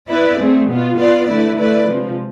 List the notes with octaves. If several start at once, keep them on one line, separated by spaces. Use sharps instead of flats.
B3 E4 B4 D5
A3 C4 G#4
B2 B3 F4
B3 F4 B4 D5
D3 A3 E4 B4 D5
A3 E4 B4 D5
C3 F3 G#3